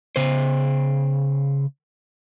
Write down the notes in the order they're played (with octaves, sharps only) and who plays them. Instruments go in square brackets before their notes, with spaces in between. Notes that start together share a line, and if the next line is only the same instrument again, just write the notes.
[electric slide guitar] C#3 C5